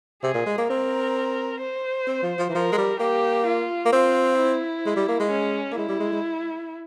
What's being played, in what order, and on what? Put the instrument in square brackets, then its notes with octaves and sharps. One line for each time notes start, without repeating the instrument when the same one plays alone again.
[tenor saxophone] C3 [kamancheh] G#4
[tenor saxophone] A#2
G#3
A#3
[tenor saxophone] C4 [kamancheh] A#4
[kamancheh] C5
[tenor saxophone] C4
F3
F3
E3
[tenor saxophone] F3 [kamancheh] A#4
[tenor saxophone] G#3
G3
[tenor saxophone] A#3 [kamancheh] G4
[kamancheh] F4
[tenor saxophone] A#3
[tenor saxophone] C4 [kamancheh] F4
[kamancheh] E4
[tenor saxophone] G#3
G3
A#3
G#3
[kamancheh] C#4
[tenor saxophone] A#3
[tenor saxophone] G#3 [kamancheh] E4
[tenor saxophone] G3
G#3
G#3